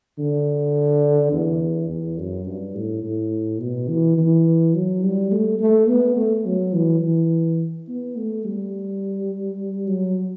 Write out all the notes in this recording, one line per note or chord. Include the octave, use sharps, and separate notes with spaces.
D3
E2
E2
F#2
G2
A2
A2
B2
E3
E3
F#3
G3
A3
A3
B3
A3
F#3
E3
E3
B3
A3
G3
F#3